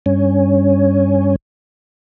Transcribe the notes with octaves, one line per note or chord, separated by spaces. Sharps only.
G2 C#4